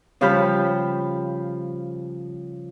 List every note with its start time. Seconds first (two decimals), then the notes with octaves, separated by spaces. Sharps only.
0.21 C#3 F3 G3 G4 F5 B5